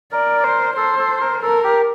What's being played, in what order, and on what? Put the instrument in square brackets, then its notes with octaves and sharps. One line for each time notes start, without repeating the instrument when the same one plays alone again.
[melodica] A#4 [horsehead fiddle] D5
[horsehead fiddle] C5
[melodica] A4 [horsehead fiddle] C5
[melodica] A4
A#4
[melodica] A4 [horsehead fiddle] A#4
[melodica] G4